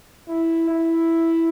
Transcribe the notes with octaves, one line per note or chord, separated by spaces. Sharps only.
E4
E4